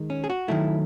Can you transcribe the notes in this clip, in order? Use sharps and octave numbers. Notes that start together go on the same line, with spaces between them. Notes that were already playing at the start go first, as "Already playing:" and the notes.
Already playing: D#3 G#3
C#4
G#4
F#4
D#3 F#3 A3 E4